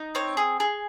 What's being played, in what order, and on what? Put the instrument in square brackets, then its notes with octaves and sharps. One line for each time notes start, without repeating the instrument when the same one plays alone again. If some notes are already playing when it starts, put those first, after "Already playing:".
Already playing: [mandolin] D#4
C4 C#5
G#4
G#4